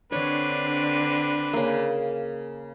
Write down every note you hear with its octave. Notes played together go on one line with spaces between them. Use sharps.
D3 C4 D4 B4 C#5
C#3 A#3